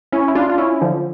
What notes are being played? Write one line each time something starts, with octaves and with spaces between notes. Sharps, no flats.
C#4 E4
E4
D4 F4
F4
C#4 E4
D3 F3